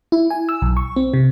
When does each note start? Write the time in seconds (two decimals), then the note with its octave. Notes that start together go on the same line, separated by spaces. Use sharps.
0.12 E4
0.31 G#5
0.49 E6
0.62 B1
0.77 C#6
0.96 C4
1.14 C3